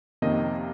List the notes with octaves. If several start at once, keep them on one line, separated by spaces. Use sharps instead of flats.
F2 C3 D#3 A#3 C#4 D#5